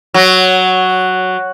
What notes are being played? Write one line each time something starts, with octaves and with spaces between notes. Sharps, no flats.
F#3